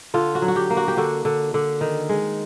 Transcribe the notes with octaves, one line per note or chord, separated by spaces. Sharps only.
D3 F4
F#4
F#3
F#4
G4
A#3
F#4
G4
D3 F#4
D3
D3
D#3
G#3